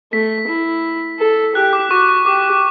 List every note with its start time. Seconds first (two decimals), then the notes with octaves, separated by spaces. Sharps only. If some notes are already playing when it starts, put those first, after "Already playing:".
0.13 A3 B6
0.48 E4
1.19 A4
1.55 G4 F#6
1.73 D6
1.91 F#4 C#6
2.08 C#6
2.26 G4 D6